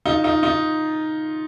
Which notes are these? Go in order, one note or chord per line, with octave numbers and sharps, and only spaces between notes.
D#4 F4
D#4 F4
D#4 F4